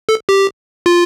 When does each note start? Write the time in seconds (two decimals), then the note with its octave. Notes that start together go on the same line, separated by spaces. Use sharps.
0.09 A4
0.29 G4
0.86 F4